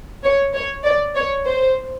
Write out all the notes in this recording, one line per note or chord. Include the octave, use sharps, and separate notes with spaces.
C#5
C#5
D5
C#5
C5